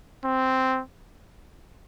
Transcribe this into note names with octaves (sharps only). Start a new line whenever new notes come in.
C4